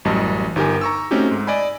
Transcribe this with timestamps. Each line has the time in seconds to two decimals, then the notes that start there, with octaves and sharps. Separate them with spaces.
0.05 A1 F#2 G3 D#5 A5
0.56 G1 D#4 G4 A#4 G#5
0.81 A#5 C#6 E6
1.11 A3 C4 C#4 D#4 F#4 G4
1.31 G#2
1.47 D5 D#5 G#5 B5